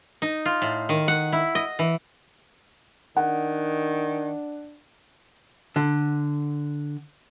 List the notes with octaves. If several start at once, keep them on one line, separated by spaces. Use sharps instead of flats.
D#4
F4
A2
D#3
F#5
E4
D#5
E3
D#3 D4 F#5
D3